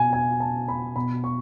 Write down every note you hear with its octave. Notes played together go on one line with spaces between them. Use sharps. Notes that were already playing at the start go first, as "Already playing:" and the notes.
Already playing: B2 G#5
G#5
A5
B5
B2 B5
C#6